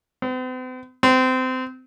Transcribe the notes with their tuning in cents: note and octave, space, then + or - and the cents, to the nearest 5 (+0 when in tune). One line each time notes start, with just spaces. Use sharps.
C4 -45
C4 -25